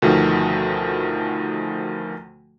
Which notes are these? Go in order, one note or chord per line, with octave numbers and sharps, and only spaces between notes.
D2 B2 D#3 F3 A3